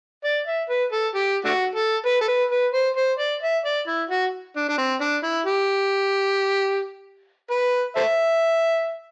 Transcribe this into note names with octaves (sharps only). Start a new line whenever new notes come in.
D5
E5
B4
A4
G4
A3 D4 F#4
A4
B4
A4
B4
B4
C5
C5
D5
E5
D5
E4
F#4
D4
D4
C4
D4
E4
G4
B4
A4 C5 E5